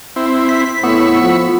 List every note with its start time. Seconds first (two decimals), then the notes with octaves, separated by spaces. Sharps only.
0.16 C4 E4
0.49 B6
0.83 A2 B3 B5 C#6 E6
1.22 F3